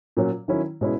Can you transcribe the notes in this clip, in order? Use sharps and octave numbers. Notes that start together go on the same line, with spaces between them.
A#2 F#3 C#4
D#3 F#3 C#4 E4
B2 G#3 C#4 E4